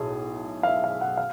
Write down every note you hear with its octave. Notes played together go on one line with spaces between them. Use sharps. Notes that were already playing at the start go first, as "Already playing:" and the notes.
Already playing: B1 A2 G#4
F5
E5
F5
F#5
F5